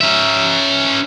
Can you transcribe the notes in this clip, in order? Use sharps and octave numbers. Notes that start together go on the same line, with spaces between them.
C#4 E5